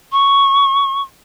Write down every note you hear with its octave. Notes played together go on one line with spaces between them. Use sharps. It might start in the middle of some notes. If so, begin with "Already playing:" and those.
C#6